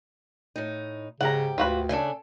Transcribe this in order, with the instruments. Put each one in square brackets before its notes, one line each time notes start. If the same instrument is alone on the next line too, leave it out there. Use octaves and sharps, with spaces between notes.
[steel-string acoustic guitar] A2 D#4
[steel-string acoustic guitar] G#2 G4 [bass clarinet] C#3 [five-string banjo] F#5 A#5
[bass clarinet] D2 [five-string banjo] F4 F#4 B4
[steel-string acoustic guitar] C#3 A3 D4 [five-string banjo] A4 G#5